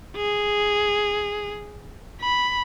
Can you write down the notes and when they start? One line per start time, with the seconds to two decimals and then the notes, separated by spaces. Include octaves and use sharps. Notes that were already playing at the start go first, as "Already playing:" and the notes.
0.16 G#4
2.22 B5